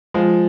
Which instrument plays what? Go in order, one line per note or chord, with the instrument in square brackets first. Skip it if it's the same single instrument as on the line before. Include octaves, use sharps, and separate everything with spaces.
[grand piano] F3 G#3